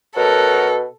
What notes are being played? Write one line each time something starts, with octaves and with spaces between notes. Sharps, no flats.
B2 A4 A#4 C#5 F#5